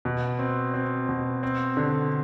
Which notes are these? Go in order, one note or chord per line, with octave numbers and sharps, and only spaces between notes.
B2
C4
C4
B2
C4
D3